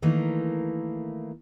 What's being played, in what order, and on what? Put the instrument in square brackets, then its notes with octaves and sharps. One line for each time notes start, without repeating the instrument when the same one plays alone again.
[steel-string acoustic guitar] D#3 E3 A3 A#3